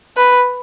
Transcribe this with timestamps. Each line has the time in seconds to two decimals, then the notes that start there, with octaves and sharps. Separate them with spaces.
0.17 B4